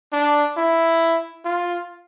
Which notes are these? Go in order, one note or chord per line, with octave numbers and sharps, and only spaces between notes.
D4
E4
F4